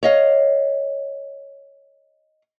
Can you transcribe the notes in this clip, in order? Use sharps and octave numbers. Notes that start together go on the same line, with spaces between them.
C#5 D#5 F5